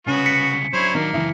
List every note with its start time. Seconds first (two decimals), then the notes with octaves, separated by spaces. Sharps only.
0.07 C2 C#3 B3 C#4 F#4 C#6
0.26 B6 C#7
0.73 F#3 D4 E4 C5 C#5
0.95 D#3 A#3
1.13 C#2 F#2 E3 E5